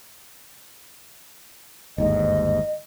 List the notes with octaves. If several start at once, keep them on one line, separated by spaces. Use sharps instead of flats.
G1 D#2 G#2 D#5